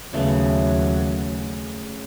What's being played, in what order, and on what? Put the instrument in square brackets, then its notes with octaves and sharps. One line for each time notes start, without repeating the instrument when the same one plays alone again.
[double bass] D#2 F#3 [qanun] C#3 A3 B3